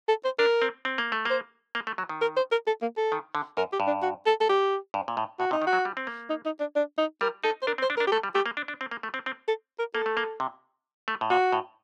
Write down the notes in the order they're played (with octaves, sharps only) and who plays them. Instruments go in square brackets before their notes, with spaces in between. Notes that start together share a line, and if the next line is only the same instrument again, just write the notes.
[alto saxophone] A4
C5
[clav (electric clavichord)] D4 [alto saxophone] A#4
[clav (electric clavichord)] C4
C4
A#3
A3
[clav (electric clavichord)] A#3 [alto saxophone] C5
[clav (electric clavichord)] A#3
A3
F#3
D#3
[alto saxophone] A#4
C5
A#4
A4
A#3
A4
[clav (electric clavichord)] D#3
D3
[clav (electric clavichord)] F#2 [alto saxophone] A#4
[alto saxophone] G4
[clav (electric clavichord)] G2
[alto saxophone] D4
F#4
A4
A4
G4
[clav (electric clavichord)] G2
A#2
A2
[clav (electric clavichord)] A2 [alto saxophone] F#4
[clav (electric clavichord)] C3 [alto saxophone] D#4
[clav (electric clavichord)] D#3
[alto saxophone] F#4
[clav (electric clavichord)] F#3
G3
C4
A#3
[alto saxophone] D#4
D#4
D4
D4
D#4
[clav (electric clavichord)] G3 [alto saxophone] A#4
[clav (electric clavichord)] D#4 [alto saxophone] A4
[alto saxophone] C5
[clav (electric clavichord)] D4 [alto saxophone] A#4
[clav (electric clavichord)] C4
[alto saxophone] C5
[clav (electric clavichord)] D4
[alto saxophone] A#4
[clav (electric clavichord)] D4
[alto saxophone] G4
[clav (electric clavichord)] A3 [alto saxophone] A4
[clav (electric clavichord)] G3
[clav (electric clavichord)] A3 [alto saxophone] G4
[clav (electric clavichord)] A#3
D4
D4
C4
A#3
A3
C4
C4
[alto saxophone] A4
A#4
[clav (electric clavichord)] A#3 [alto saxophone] A4
[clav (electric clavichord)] A3
A#3
C3
A3
A2
[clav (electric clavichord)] A#2 [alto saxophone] F#4
[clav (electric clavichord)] A2